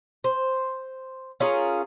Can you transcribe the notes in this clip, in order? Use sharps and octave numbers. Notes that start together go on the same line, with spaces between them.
C5
C#4 F4 G#4 A#4